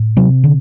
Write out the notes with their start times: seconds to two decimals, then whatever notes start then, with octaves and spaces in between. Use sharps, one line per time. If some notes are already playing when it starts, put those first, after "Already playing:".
Already playing: A2
0.17 C3 F#3
0.44 D3